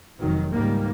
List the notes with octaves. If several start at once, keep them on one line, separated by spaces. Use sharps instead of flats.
F1 D#3 F#3
C#2 G#2 D#3 G3 A#3